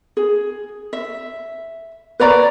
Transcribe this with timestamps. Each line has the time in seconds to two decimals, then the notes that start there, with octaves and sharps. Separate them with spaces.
0.17 G#4
0.93 E5
2.20 B4 C#5 D5 A#5